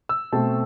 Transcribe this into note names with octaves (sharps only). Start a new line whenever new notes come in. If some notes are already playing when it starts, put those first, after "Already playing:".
E6
B2 A3 C4 A5